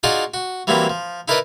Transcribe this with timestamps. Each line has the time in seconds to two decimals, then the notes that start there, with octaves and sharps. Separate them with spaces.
0.03 D#4 F4 F#4 G#4 D5 D#5
0.34 F#4
0.67 E3 F#3 G3 A#3 C4 E4
0.90 F3
1.28 D#4 E4 A#4 B4 D5 D#5